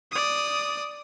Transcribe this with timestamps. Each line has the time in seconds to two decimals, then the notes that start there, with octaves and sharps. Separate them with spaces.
0.12 D5 D#6